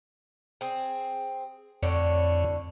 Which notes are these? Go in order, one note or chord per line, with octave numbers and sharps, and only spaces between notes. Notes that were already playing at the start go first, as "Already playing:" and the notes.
C4 G#4
F2 A2 D3 C#5